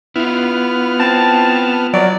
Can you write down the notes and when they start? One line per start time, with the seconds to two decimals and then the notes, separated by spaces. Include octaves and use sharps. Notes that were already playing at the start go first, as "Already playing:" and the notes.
0.16 B3 E4 F4 F6
1.00 C4 A5
1.93 F#3 D5